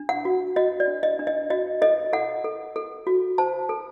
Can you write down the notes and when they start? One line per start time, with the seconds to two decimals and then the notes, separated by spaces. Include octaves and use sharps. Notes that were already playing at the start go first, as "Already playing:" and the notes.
Already playing: D4
0.09 F#5
0.25 F#4
0.56 F#4 D#5
0.80 D5
0.88 D4
1.03 D#5
1.19 D4
1.27 D#5
1.50 F#4 D#5
1.82 A4 D#5
2.13 A4 F#5
2.44 A4
2.76 A4
3.07 F#4
3.38 C5 A5
3.69 A4